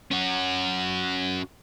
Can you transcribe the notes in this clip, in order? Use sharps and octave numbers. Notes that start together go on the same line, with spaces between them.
C#4 F#4